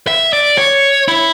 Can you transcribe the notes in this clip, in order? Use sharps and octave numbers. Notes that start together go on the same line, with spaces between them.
E5
D5
C#5
E4